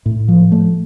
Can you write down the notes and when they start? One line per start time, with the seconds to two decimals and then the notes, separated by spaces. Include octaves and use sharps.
0.06 A2
0.28 F3
0.52 A3